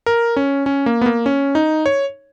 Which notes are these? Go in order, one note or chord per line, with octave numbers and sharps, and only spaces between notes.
A#4
C#4
C#4
A#3
B3
A#3
C#4
D#4
C#5